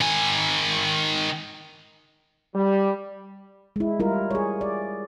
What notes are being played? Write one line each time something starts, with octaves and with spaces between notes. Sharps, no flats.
D#3 G#5
G3
G#3 E4
G3 E4 F4 A#4
G#4 C#5
D5